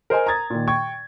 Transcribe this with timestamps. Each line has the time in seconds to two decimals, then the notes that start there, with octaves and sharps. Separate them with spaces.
0.10 A#4 C5 D#5 G#5
0.27 A#5 D#6 G#6 A6
0.50 A#2 D#3
0.67 G5 C#6 G#6